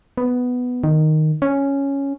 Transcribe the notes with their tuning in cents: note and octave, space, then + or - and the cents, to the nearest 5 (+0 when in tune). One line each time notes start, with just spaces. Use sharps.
B3 +5
D#3 -5
C#4 +0